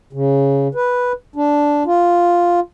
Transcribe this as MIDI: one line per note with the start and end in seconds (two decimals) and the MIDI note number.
0.13 0.68 49
0.75 1.12 71
1.36 1.83 62
1.86 2.60 65